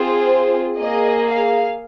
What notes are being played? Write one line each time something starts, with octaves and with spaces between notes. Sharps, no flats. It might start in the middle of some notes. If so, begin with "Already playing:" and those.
Already playing: C4 F4 G#4 C5
A#3 G#4 D#5
F5